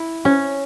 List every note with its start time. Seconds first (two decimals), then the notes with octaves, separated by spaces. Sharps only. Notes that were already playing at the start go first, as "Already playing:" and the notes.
Already playing: E4
0.25 C#4